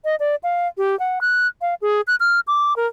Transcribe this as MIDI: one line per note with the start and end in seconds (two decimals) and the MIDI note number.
0.05 0.16 75
0.20 0.35 74
0.43 0.67 77
0.78 0.98 67
0.99 1.19 78
1.21 1.47 90
1.61 1.74 77
1.82 2.01 68
2.07 2.15 90
2.20 2.40 89
2.47 2.76 86
2.76 2.87 70